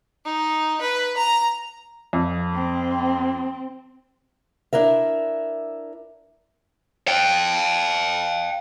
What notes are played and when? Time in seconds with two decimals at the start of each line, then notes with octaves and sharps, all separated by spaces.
0.25 D#4
0.81 B4
1.17 A#5
2.13 F2
2.54 C4
4.73 D4 E4 A#4 E5
7.08 F5 G5